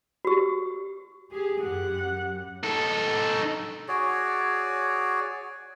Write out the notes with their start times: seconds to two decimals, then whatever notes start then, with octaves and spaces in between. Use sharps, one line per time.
0.25 F#4 G4
1.31 G4 G#4
1.62 F#2 G4 F#5
2.64 D#4 A4
3.88 F#4 G#4 C#5 D5